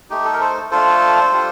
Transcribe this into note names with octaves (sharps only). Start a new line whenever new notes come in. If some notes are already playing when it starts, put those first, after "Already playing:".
A3 D#4 G4
A4
A#4
A4 C5
A3 D4 F4 A4 C5
G3 D4 F4